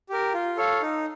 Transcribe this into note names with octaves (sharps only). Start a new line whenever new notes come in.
G4 A#4
F4
A4 C#5 F5
D#4